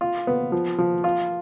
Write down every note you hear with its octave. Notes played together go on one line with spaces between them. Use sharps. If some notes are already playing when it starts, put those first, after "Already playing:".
F4
B3
F3
F3
F4